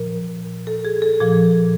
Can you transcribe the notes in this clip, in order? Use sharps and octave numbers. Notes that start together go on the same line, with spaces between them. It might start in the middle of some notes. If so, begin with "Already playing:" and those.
Already playing: A#2 F3 A#4
A4
G#4
A4
A#2 F3 G#4